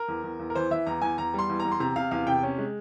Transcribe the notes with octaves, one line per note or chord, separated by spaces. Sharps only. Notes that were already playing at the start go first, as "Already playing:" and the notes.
Already playing: A#4
E2
E2
E2
A#4
E3 C5
E3 E5
E2 A#5
E2 G#5
E2 A#5
G3 C6
E2
E2 A#5
C6
C3 A#5
C3 F5
E2 F5
C3 G5
C#4
G#3